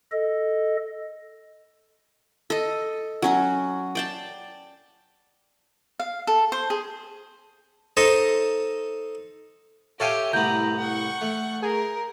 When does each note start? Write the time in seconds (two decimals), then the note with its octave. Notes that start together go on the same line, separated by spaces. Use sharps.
0.12 A4 D#5
2.50 A4 D#5
3.22 F#3 C#4 F#4
3.95 D5 G5 A5
6.00 F5
6.27 A4
6.52 C5
6.70 G#4
7.97 D#4 A4 C5 D#5
10.00 G4 A4 C#5 E5 F5 G5 G#5
10.33 C2 A2 B3 A#5 G6
10.79 F#5 C#6
11.21 A3
11.62 G#4 A#4